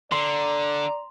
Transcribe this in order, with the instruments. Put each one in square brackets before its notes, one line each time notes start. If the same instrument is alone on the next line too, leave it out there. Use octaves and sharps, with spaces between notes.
[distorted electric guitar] D3 [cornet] D5 [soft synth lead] A#5 [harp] C6